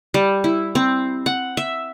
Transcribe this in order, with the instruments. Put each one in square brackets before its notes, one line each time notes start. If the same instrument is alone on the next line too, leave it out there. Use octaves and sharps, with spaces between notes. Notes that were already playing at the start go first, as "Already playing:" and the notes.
[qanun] G3
E4
C4
F#5
E5